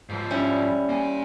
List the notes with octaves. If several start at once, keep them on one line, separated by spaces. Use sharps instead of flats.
G#2 F3
G3 C#4 E4
A#3 G#5